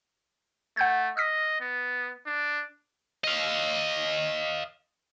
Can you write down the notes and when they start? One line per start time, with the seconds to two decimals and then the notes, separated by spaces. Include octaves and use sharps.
0.77 A3 F#5 G6 G#6
1.17 D#5 E6 F6 B6
1.61 B3
2.26 D4
3.24 D#5 F5